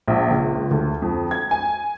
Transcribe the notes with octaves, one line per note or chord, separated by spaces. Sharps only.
A#1
C#2
D2
F2
G#6
G#5